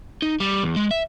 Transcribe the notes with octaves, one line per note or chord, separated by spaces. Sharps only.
D#4
G3
E2
G#3
E5